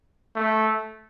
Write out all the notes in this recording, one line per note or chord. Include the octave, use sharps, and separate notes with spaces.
A3